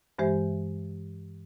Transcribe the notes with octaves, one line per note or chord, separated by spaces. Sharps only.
G2 E3 G#3 G4 C5 E5